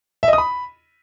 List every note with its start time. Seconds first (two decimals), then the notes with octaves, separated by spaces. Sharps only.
0.23 E5
0.28 D#5
0.33 D#6
0.38 B5